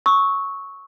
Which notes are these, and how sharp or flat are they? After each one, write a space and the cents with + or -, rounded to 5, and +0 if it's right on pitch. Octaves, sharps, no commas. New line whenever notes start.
C#6 +0 E6 -30